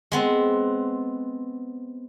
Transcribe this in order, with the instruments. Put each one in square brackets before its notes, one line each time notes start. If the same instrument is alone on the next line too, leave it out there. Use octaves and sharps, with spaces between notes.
[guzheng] G#3 B3 C4